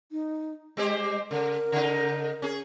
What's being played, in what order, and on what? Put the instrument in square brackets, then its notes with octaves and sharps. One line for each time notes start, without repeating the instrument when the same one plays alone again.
[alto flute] D#4
[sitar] G3 G4 C5 [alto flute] G#3
[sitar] C#3 [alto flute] A#4
[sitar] C#3 D#4
C#4 G#4